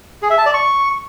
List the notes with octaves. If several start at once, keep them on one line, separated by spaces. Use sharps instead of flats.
G#4
E5
A5
D5
C#6